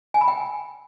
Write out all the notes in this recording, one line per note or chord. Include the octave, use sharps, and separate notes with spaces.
G#5
B5
G5